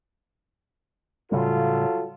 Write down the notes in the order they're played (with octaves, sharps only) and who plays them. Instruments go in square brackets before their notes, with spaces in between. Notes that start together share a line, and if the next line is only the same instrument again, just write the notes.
[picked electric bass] A2 C#3 G3 [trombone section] F#3 F4 A4